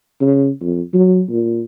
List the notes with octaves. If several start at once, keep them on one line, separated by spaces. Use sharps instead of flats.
C#3
F2
F#3
A#2